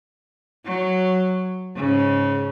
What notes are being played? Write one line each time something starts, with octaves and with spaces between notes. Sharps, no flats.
F#3
G#2 C#3